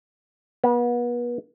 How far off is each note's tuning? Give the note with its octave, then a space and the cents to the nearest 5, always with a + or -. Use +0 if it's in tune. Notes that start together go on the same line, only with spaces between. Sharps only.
B3 -35